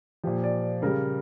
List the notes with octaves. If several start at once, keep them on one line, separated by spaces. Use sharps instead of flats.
A#2 F3 G4
D5
C#3 G3 A#4